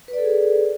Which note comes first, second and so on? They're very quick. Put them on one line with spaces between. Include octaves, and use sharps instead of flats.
B4 D5 A4 G#4